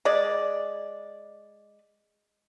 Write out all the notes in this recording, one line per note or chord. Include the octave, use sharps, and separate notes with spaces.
G#3 D5